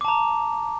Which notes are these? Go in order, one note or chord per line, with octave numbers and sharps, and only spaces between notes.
A5 A#5 D6